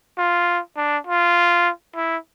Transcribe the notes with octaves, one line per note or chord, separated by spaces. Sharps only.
F4
D4
F4
E4